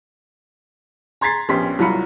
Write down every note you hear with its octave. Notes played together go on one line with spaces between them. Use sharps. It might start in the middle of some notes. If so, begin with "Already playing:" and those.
A#5 C6 G#6 A6 B6 C7
A#1 B3 C#4 G4 C6 B6
C2 F#3 F4 A#5 B5 C#7